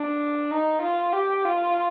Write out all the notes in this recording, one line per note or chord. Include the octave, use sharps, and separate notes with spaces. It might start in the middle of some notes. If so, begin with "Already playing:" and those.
Already playing: D4
D#4
F4
G4
F4